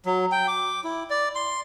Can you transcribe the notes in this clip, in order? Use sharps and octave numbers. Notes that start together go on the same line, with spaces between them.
F#3
G5
D6
E4
D5
C6